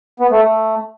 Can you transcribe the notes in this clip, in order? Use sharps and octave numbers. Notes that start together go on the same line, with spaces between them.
B3
A3
A3